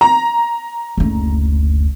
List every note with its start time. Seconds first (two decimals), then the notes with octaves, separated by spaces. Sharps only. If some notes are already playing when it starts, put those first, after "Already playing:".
0.01 A#5
0.98 F#1 D2